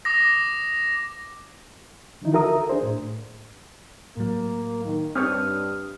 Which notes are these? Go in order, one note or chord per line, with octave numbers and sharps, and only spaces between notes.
D6 D#6 A#6
D3 D#3 F3 D#4 E4
F#4 A4 A#4 E5 A#5 D#6
D4 G#4 C5
A2
A2 F#3 A#3
D#3
G2 C4 G4 C#5 D#6 F6